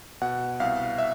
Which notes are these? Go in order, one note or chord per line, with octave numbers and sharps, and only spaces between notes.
B2 F#5
C2 F5
E5